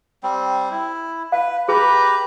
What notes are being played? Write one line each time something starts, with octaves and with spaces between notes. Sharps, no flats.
G3 C4
E4
B4 F5
G4 G#4 B4 A#5